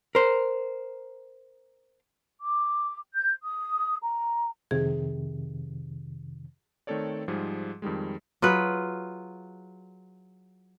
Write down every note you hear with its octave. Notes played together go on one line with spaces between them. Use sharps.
A#4 C5
D6
G6
D#6
A#5
F2 C3 D#3 G#4
D#3 A3 C4 A4 C#5 D5
G#2 F3 G3 G#4
F2 D#3 G3 G#3
F#3 F4 G#4 B4